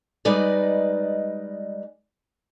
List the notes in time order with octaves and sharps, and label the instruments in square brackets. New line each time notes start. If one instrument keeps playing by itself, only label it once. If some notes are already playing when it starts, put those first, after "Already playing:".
[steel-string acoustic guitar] G3 G#3 D#4 B4 D5 D#5